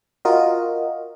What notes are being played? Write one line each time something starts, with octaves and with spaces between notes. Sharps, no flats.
F4 F#4 A#4 D#5